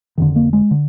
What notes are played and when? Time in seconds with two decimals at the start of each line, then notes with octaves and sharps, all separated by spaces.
0.18 F1 F2 D3 D#3
0.36 A#3
0.53 G#3
0.71 D3